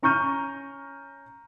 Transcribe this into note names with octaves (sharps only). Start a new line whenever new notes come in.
C#4 A#5 C#6 F6 G6 D#7